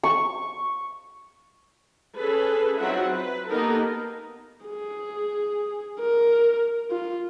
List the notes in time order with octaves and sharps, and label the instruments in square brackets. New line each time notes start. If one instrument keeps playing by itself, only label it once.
[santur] C#6
[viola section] C#4 G#4 A4 B4
F#3 C4 D#4 F4 E5 F#5
B4
A#3 B3 D#4 G4 A4 A#4
[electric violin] G#4
A#4
F4